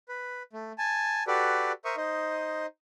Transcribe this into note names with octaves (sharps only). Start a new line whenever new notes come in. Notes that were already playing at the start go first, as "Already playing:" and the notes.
B4
A3
G#5 A5
F#4 G4 A4 B4 D5
A#4 C5 E5 C#6 D#6
D#4 C5 D#5